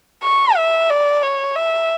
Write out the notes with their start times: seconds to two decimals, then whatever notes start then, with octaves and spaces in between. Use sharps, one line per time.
0.24 C#6
0.56 E5
0.90 D5
1.23 C#5
1.55 E5